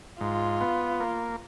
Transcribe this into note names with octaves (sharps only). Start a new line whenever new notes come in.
G#2 F4
B3
A#3